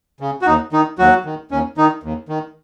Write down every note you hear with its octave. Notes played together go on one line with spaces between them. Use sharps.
C#3
F#4
D#2 D#4
D#3 D#4
D#2 F#3 F#4
D#3
D#2 C#4
D#3 D#4
D#2
D#3